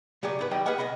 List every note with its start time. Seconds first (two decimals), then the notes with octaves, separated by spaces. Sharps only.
0.23 C#3 F#3 G4 G#4 D5
0.39 G#2 D#4 B4
0.51 D#3 F#3 G3 G4 D#5 G5
0.66 G#4 B4 D#5 F5 F#5 G#5
0.78 C#2 G3 D#5 F#5 B5